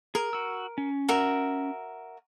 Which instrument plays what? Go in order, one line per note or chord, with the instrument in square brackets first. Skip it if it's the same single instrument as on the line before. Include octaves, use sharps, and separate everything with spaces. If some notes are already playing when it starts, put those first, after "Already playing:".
[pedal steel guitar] G#4 [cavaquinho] A#4
[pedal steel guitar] F#4 E6
C#4
[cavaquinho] F#4 A#4 E5